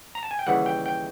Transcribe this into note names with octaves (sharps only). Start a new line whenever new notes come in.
A#5
A5
G#5
G5
D#2 C#3 E3 G3 F#5
G5
G5